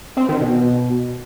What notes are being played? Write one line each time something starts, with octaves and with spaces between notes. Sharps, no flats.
C4
D#3
B2